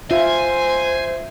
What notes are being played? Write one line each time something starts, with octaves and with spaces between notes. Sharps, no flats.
F4 C5 E5 G#5